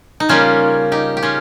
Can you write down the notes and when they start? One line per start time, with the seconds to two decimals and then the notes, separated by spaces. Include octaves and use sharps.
0.20 D#4
0.29 C#3 G3 A#3 C#4 F4
0.92 D#4 G4
1.17 G4
1.23 C#4 F4